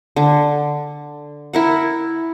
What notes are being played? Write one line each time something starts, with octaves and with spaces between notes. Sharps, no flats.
D3
E4 A#4 F#5